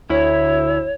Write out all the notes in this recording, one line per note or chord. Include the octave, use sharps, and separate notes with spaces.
D2 E4 C#5